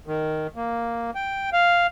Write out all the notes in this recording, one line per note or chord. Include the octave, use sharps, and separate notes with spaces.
D#3
A#3
G5
F5